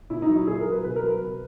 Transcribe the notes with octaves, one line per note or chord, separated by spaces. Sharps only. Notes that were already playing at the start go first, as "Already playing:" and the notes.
A#2 E4
D#4
F#3
E4
A#2 G#4
A#4
F#3
B4
B2 B4
A#4
F#3
B4
B2